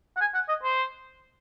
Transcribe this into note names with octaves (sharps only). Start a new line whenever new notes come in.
F#5
G#5
F#5
D#5
C5